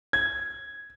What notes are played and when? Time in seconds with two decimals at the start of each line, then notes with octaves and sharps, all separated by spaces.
0.13 G#6